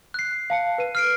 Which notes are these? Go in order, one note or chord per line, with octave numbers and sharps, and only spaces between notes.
F#6 C7
F5 A5 C#7
B4 D#7
F6 C7 D7